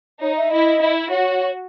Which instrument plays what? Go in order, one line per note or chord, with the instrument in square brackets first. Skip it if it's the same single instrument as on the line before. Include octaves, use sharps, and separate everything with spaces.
[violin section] D#4 [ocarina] C#5
[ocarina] E5
[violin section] E4 [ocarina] D#5
[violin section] E4
[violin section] F#4 [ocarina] C#5